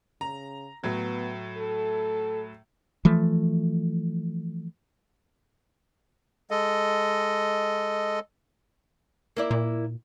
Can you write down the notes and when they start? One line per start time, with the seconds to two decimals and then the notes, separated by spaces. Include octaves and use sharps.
0.21 C#3 A#5
0.84 A2 F#3 B3
1.58 A4
3.05 E3 F3 A3
6.51 G#3 A4 D#5
9.37 A#3 E4 D5
9.51 A#2